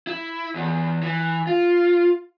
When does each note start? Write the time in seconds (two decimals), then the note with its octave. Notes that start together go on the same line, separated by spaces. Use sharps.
0.07 E4
0.55 E2
1.03 E3
1.47 F4